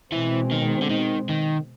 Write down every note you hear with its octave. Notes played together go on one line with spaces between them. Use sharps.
B2 E3 G#3 C4
D#3
D3
D#3
D#3